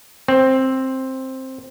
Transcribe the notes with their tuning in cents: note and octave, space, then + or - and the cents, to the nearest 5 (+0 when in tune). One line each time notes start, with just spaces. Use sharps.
C4 +10